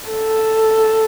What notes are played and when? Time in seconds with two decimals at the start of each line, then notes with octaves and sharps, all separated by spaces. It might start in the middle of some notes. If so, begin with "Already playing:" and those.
0.11 A4